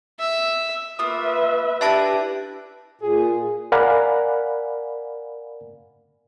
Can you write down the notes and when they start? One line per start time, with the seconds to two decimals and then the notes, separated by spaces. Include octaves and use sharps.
0.20 E5
0.99 A#3 F4 B4 E5 D#6
1.81 D4 E4 G4 B4 E5 A5 A#6
3.01 A#2 G#4
3.72 A#4 D5 F5 F#5 G#5 B5